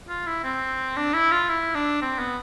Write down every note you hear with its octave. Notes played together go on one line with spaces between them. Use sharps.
F4
E4
C4
D4
E4
F4
E4
D4
C4
B3